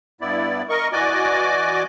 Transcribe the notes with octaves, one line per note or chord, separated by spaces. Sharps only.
G2 B3 E4 D5
A#4 D#5 C#6
E3 F#4 D5 D#5 G#5 D6